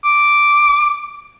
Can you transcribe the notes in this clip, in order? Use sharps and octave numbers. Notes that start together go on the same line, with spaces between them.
D6